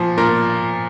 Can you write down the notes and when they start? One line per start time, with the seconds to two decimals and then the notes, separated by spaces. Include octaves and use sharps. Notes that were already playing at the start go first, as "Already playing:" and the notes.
Already playing: A#2 F3
0.18 A#2 A#4